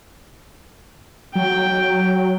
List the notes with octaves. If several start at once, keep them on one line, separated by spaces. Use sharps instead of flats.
F#3 G5